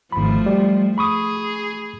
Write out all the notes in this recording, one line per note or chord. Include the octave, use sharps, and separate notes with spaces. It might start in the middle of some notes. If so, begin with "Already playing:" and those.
G#1 F3 A3 B5
G3
G#4 B5 C#6 D#6